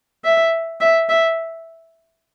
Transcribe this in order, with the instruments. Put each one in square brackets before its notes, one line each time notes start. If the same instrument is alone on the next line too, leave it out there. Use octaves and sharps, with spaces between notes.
[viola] E5
E5
E5